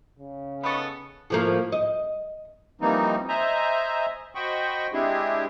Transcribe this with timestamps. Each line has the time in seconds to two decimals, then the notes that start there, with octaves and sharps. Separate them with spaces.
0.19 C#3
0.63 D#3 B3 A4 B5 C#6 D#6 A6
1.30 A2 F3 A#3
1.72 D#5
2.81 E3 F3 G3 A#3 C4 D#4
3.28 C5 D#5 E5 G#5 A#5
4.35 F#4 C5 D#5 G5 B5 C#6
4.93 G#3 C4 D4 E4 G4 G#4